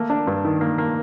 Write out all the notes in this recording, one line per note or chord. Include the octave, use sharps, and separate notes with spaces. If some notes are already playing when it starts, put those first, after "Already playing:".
Already playing: A3 A#3
D4
G2
D#3
A#3
A#3